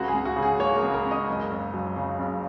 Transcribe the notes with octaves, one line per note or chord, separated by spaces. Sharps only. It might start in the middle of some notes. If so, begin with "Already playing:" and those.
Already playing: C#2 F#4
G#4
C#2
F#4
C#3
G#4
A#3 C#5
A#4
C#2
A#4
C#2
D#5
F#1
F#1
F#2
C#3
F#1